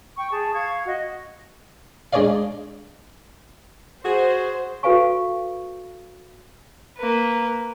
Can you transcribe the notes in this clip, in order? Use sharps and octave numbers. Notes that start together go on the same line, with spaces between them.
G5 C#6
G#4 A5
F5 C#6 G#6
F#4 D#5
G#3 D4 G#4 C#5 D5 F5
F#4 G#4 C5
F#4 A4 B4 F5 G#5 C#6
A#3 B4